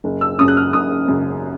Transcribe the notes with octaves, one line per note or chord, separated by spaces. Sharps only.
F#1
E6
F#2 C#3 D#6
F#6
F6
F#1 D#6
F#2 C#3